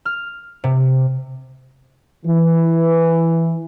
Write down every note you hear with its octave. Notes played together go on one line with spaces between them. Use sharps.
F6
C3
E3